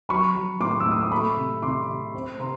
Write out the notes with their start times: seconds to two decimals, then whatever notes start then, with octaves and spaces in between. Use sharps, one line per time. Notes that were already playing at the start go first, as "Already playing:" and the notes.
0.09 F#3 B5 C#6
0.35 F#3
0.60 A2 C6 D6
0.80 E6
0.86 A2
0.91 D#6
1.02 D6
1.11 A3 B5 C#6
1.37 C3
1.62 C3 C6 D6
1.89 C3
2.14 C4
2.39 C3 A#5 C6